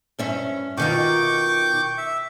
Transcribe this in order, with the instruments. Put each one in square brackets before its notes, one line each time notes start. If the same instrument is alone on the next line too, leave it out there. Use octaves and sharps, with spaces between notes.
[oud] G2 C#4 E5
[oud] B2 D#3 F4 [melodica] G5 C#6 D6
[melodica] E5